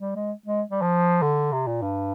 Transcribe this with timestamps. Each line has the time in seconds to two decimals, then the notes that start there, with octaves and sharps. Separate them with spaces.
0.01 G3
0.16 G#3
0.46 G#3
0.71 G3
0.82 F3
1.22 D3
1.52 C3
1.67 A#2
1.82 G2